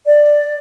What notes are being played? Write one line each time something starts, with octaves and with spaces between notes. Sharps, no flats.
D5